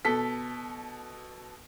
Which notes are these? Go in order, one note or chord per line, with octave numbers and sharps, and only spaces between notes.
B2 A4 B6